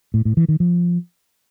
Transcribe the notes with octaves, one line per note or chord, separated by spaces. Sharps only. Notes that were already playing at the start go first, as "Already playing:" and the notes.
A2
A2
E3
D#3
F3